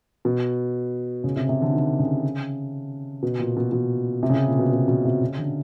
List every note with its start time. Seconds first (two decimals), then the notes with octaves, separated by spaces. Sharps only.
0.25 B2
1.24 C#3
1.36 C3
1.49 C3
1.62 D3
1.73 D#3
1.99 C#3
3.23 B2
3.39 A#2
3.57 B2
3.72 B2
4.23 C3
4.30 C#3
4.34 C3
4.47 A#2
4.59 B2
4.72 B2
4.88 B2
5.05 C3
5.21 C#3
5.38 D3